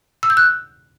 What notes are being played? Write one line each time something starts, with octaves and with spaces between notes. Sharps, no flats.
E6
G6
F#6